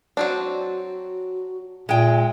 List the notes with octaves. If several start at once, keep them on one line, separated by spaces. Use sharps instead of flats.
F#3 C4 D4 F#4
A#2 G#3 E5 G5